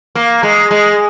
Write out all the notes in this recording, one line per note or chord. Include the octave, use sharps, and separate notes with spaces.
A#3
G#3
G#3